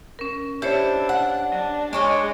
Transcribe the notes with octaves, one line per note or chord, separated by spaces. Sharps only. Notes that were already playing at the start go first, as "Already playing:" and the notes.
C#4 A#4
D4 E4 G4 C5 C#5
F#5
F#3 D4
G#3 D4 C#5 D#5